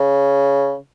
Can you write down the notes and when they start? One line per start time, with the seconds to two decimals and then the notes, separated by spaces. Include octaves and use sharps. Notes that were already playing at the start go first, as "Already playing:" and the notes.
Already playing: C#3